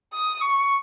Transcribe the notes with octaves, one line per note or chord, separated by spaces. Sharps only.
D#6
C#6